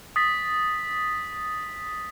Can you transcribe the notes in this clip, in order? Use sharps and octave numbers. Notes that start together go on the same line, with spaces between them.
D#6 A6 B6